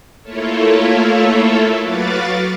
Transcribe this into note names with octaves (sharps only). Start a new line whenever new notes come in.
A3 A#3 E4 F4 A4 C#5
F#3 F#4 B4 F5 D6 A6